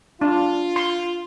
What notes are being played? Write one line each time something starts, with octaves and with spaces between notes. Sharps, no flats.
D4 F4
C6